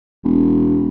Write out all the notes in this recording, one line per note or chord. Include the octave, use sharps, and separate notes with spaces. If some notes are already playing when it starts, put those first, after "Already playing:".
E1